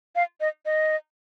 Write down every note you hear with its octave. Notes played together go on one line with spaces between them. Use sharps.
F5
D#5
D#5